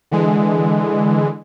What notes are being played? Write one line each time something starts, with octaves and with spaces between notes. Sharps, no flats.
D3 E3 G#3